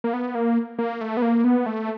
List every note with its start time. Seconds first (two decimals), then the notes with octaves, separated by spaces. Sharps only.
0.04 A#3
0.13 B3
0.35 A#3
0.79 A#3
1.01 A3
1.17 B3
1.22 A#3
1.44 B3
1.66 A3